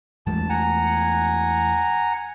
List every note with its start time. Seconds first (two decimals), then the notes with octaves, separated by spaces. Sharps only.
0.26 E2 G#3 A3 A5
0.50 F#5 G#5 A#5